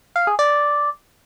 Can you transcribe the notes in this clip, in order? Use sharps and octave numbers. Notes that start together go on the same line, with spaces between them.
F5
G#4
D5